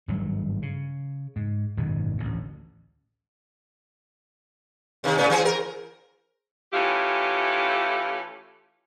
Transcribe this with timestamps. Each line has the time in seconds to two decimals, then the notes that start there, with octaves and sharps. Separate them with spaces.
0.08 G#1 G2 F#3
0.62 C#3
1.36 G#2
1.77 G#1 F#2 B2 D#3
2.18 A1 D2
5.04 C3 D#3
5.18 A2 C#3 B3
5.30 E3 C4 G#4
5.45 A#4
6.73 E3 A3 C#4 E4 F4 G4